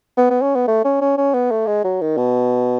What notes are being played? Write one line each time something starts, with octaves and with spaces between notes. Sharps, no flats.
B3
B3
C#4
B3
A3
C#4
C#4
C#4
B3
A3
G#3
F#3
D#3
B2